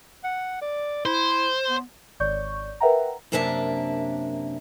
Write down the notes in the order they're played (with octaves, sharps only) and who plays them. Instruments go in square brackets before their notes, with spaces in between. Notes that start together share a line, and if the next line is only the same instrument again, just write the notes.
[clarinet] F#5
D5
[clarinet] E4 [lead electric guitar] C5
[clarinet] B3
[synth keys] G#1 C#5 D5 C#6 G6
A#4 B4 E5 F#5 G5 A#5
[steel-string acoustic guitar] F#2 C3 A#3 D4 E5 A5